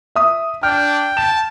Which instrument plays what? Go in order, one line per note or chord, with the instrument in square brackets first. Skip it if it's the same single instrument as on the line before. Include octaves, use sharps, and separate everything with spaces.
[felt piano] E5 D#6
[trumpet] D4 [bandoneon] G5 [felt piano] F6
[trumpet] A5 [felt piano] E7